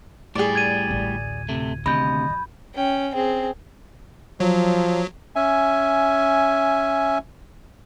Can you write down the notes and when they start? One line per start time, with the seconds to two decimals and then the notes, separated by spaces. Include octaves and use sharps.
0.35 A2 G3 G#4 D5
0.55 G#6 D#7
0.91 A1 D2
1.49 C3 A3
1.86 D2 C3 D#3 D#5 B5 G6
2.30 F#2
2.75 C#4 G5
3.14 C4 G#4
4.40 F3 F#3
5.36 C#4 E5 G#5